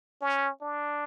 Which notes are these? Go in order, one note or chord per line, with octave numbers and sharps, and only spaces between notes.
C#4
D4